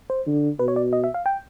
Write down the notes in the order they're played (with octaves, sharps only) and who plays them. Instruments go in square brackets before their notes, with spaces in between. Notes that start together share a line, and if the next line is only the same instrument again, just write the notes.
[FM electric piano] C5
[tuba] D3
[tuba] B2 [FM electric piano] B4
[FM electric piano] C#5
D5
D#5
E5
F5
G5